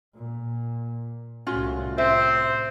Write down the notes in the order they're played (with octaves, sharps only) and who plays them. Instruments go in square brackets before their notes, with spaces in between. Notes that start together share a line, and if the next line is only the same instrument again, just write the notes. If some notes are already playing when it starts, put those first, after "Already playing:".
[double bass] A#2
[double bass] C2 A2 [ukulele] C#4 F4 F#4
[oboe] C4 [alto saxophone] C5 [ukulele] E5